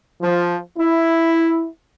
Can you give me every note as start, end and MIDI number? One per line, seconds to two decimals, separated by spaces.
0.21 0.58 53
0.78 1.67 64